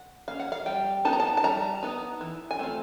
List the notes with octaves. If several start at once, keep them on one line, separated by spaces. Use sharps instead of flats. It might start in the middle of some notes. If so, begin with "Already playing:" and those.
Already playing: F#5
A#3 C#4 F5
F#5
F5
G3 G5
B3 D#4 A5
A#5
A5
A5
G3 A#5
B3 D#4
E3
G#5
A3 C4 F4